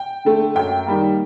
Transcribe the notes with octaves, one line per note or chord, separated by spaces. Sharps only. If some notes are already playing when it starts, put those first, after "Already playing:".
Already playing: G5
D3 A3
F#2 G5
D#3 G3 A#3